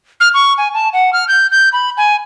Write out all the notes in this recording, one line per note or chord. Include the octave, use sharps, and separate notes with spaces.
F6
C#6
G#5
A5
F#5
F6
G6
G6
B5
G#5